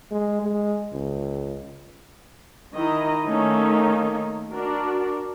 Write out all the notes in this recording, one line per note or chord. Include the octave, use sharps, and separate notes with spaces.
G#3
G#3
C#2
D#3 E4 D#5 A#5
D#3 A3 A#3 C#4 D#4
D4 F#4 A#4 D5